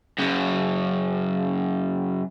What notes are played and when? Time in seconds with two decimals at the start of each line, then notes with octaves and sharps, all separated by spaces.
0.18 F#2 C#3